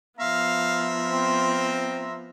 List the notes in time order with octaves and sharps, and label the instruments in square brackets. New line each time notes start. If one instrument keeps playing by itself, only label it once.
[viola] F3 B3 [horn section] E5 A#5 C6 [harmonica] F5
[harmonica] C4